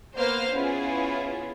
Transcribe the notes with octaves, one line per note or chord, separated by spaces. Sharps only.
A#3 B3 B4 C5 F5 F6
B3 C#4 E4 F4 G#4